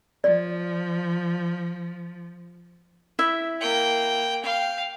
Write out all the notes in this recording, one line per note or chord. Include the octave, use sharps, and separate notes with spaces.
F3 D5
E4 E5
A#3 G5
F5 G5